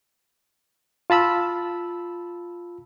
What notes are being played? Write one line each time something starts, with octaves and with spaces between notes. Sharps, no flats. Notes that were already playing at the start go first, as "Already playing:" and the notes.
F4 A5 B5 E6